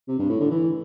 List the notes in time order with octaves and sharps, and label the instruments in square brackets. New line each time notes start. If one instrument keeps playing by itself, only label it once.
[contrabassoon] C3
G2
A2
D3
E3